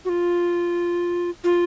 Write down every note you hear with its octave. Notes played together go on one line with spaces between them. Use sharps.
F#4
F4
F4